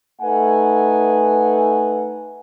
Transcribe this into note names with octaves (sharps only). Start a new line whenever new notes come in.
A3 D#4 B4 F#5 G#5